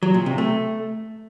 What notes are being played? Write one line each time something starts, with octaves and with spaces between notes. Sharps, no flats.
F#3
A#2
C3
A3